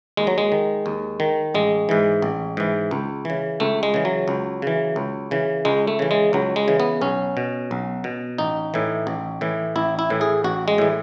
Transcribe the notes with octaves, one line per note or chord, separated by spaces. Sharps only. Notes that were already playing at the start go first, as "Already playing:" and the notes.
D#2 G#3
F#3
G#3
D#3
D#2
D#3
A1 G#3
G#2 E3
A1
G#2 E3
C#2
C#3 E3
C#2 A3
G#3
C#3 E3
F#3
C#2
C#3 E3
C#2
C#3 E3
C#2 G#3
A3
C#3 E3
G#3
C#2 F#3
G#3
C#3 E3
B3
B1 C#4
B2
B1
B2
A1 D#4
A2 E3
A1
A2 E3
A1 E4
E4
A2 E3
G#4
A1 F#4
G#3
A2 E3